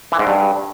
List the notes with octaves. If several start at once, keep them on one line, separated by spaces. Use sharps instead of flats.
E3
G#2
G2